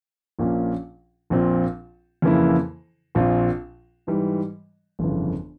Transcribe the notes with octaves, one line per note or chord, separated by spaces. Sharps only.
A#1 A#2 F3 A#3 C#4
A#1 A#2 F3 C4 F4
F2 C#3 E3 A#3 E4
A#1 A#2 F3 C4 F4
G#2 E3 G3
G1 F2 C#3 E3